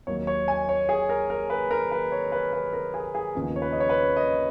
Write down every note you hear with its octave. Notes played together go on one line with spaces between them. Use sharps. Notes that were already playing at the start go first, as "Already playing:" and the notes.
D#2 D#3 F#3 A#3 D#4 C#5
C#5
G#5
C#5
G#4
A#4
A#4
B4
A#4
B4
C#5
B4
B4
A#4
G#4
G#4
D#2 C#3 F3 B3 D#4
C#5
B4
D#5
C#5
B4
D#5